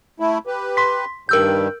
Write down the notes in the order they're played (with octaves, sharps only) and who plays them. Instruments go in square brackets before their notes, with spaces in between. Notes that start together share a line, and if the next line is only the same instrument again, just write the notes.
[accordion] A3 E4
G4 B4
[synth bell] C6 B6
[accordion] G2 D#3 G3 [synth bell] A#4 E6 G6